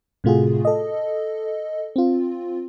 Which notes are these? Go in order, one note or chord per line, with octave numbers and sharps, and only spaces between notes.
A2 C3 A3 F4 F#4 G#4
A4 D#5
C4 F4